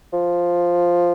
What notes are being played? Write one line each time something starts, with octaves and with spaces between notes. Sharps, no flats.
F3